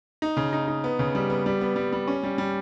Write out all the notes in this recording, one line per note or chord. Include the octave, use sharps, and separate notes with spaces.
D#4
C#3
D#4
D#4
B3
C#3
G3
B3
G3
B3
G3
G3
C#4
G3
G3